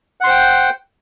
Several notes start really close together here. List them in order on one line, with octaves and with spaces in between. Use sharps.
F#5 C6 C5 G5